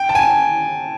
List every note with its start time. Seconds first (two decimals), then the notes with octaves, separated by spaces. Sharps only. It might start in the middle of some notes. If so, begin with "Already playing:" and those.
Already playing: G5
0.09 A5
0.15 G#5